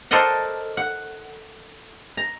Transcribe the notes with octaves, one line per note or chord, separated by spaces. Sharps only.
A4 A#4 C5 D5 D#5 F#5
F#5
A#5